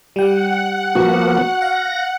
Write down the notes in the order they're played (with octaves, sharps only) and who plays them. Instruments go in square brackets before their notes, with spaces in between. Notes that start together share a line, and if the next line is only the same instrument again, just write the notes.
[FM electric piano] G3 G5 [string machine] F#5
[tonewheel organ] F3 A#3 B3 [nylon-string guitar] F#4
[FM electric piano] F5 [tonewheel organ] A#6